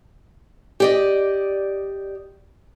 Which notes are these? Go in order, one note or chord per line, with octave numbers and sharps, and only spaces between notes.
G4 D5 D#5